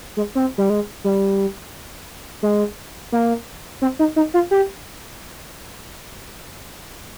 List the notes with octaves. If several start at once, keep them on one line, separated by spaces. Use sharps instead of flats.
G#3
C4
G3
G#3
G3
G#3
A#3
C4
D#4
D#4
F4
G4